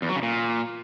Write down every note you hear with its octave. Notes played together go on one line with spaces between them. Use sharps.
E2
F#3
C#3
A#2